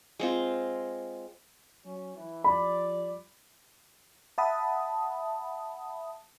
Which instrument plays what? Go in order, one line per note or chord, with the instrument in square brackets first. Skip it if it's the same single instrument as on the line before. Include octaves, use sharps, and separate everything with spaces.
[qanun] G#3 C4 F4
[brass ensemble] F#3 C#4
E3
[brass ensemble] F3 G3 D5 [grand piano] B5
[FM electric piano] E5 F#5 A5 B5 D#6